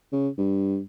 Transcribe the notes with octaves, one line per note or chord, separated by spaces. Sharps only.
C#3
G2